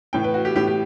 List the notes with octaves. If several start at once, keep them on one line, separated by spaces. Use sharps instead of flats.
A2 E3 G5
B4
F#4
G4
A2 E3 G4
G4